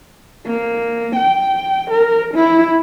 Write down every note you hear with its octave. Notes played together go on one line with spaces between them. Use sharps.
A#3
G5
A#4
E4